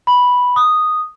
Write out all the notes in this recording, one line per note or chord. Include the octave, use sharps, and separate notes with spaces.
B5
D#6